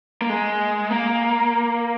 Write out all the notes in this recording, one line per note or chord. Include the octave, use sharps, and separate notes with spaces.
A#3
G#3
A#3